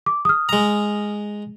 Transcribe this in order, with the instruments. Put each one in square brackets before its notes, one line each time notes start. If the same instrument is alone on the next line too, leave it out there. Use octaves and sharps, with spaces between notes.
[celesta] D6
D#6 F6
[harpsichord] G#3 A#5